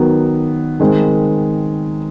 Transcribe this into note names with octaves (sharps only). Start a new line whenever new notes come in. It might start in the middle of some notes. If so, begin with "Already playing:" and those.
Already playing: D#3 F#3 B3
D#3 G#3 C4